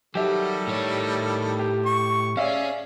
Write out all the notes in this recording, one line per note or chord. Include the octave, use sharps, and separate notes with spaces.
D#3 F#3 G3 F#4 G4 A4 E5
A2 C#5
G4
C#6
C#4 G#4 C#5 D5 E5 F5